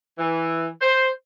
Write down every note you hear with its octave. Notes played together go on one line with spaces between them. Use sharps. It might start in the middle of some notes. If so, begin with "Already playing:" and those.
E3
C5